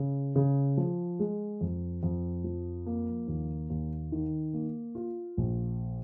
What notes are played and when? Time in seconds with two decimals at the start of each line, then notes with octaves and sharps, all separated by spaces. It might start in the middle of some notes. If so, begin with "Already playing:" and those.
Already playing: C#3
0.36 C#3
0.77 F3
1.19 G#3
1.61 F2
2.03 F2
2.44 F3
2.86 A#3
3.28 D#2
3.70 D#2
4.12 D#3
4.54 A#3
4.95 F4
5.37 A#1